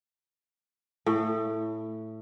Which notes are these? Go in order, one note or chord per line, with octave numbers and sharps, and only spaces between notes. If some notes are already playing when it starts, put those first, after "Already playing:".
A2